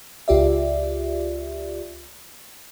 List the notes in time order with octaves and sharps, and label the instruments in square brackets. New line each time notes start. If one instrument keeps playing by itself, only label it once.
[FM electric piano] C#2 F4 G4 D5 E5